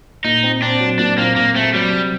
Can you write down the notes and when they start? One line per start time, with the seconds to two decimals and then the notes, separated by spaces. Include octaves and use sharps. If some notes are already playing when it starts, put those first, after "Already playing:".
0.25 A#2 D#4
0.44 C4
0.62 C4 D4
0.80 F#3
0.99 A#2 D4
1.18 A#3 C4
1.36 A#2 A#3
1.55 A3 C4
1.74 F#3 G3
1.93 C3